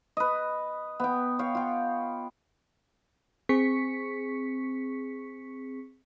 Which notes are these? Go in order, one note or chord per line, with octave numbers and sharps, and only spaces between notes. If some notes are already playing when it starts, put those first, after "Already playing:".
B4 D#5
B3 G5
C#5 F5 G5
F4 G5
C4 G#4 C#6 B6 C#7